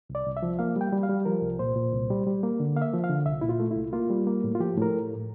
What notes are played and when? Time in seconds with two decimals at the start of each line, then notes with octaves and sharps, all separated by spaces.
0.10 C2
0.15 D5
0.26 C2
0.37 E5
0.43 F3
0.59 A#3 F5
0.76 G3 G5
0.92 G3
1.03 F5
1.09 G3
1.25 F3 A#4
1.42 C2
1.59 A#2 C5
1.76 A#2
1.92 C2
2.10 G3
2.26 G3
2.43 A#3
2.60 D3
2.76 A#3 F5
2.82 E5
2.94 F3
3.04 F5
3.10 D3
3.26 C2 E5
3.41 A#2 E4
3.49 F4
3.60 A3
3.71 E4
3.76 C2
3.93 A#3 F4
4.10 G3
4.27 A#3
4.44 A2
4.55 F4
4.59 F3 G4
4.77 A2 A#4